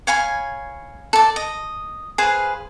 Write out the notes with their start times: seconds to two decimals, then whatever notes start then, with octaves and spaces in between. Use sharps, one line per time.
0.07 C#5 F5 G#5 B5
1.13 A4 D5
1.36 D#5
2.18 G#4 B4 C5 F5